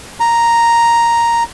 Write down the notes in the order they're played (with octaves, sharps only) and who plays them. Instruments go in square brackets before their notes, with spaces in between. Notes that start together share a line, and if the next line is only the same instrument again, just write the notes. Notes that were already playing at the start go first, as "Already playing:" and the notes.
[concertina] A#5